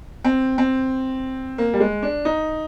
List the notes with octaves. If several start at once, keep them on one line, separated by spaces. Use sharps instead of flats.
C4
C4
A#3
G3
G#3
D4
D#4